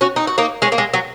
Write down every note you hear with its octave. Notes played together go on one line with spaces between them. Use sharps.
C#4 F#4
D#4
F#4
A#3 D#4
G#3 C#4
A#3
G#3
F#3